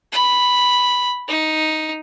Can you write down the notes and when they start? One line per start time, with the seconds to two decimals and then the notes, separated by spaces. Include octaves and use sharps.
0.12 B5
1.28 D#4